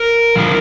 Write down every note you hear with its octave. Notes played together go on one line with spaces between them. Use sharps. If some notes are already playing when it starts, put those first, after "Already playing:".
Already playing: A#4
D3 F3